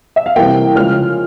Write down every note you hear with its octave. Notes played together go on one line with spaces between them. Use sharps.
E5
F5
C3 E3 G3 A#3 G5
C#3 F3 G#3 C#4 F6